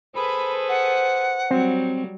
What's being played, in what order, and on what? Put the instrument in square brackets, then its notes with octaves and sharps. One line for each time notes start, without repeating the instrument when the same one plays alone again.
[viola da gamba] G#4 A4 B4 [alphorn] C5 [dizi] B5
[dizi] F#5
[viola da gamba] F#3 G3 [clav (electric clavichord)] C4